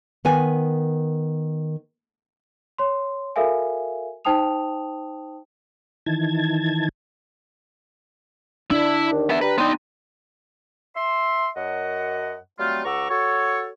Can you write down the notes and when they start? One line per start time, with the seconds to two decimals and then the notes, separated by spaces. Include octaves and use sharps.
0.25 D#3 B3 G#5
2.78 C#5 C6
3.36 F#4 A4 A#4 E5 F5 G#5
4.25 D#4 C5 G5 A5 D#6 F7
6.06 D#3 E3 A5 G#6
8.71 D4 E4
9.11 D#2
9.30 B3 E5
9.41 G3 B4 A#5
9.58 B3 D#4 D5 G5 C6
10.96 E5 C6
11.56 F#2 D#5 F#5
12.59 F#3 G3 A3 C4 F4
12.85 C#2 F#5 A#5 C#6 D6 E6
13.10 F#4 A4 C#5